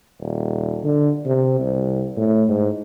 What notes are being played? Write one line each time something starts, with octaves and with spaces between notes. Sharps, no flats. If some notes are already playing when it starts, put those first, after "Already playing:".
D#1
D3
C3
C2
A2
G#2